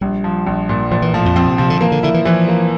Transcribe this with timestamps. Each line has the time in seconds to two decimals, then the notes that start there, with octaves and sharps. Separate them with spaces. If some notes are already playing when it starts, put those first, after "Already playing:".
0.01 A#1 G3
0.24 F3
0.47 A#1
0.69 A#2
0.91 A#2 F3
1.02 E3
1.13 A2 F3
1.25 F2
1.36 F2 C4
1.47 C3
1.58 C3 F3
1.70 D3
1.81 E3 A#3
1.92 D3
2.03 D3 E4
2.14 E3
2.25 E3 F3
2.48 A#3